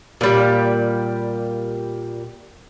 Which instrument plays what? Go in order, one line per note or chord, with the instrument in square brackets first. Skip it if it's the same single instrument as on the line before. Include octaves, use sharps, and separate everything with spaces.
[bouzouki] A#2 G3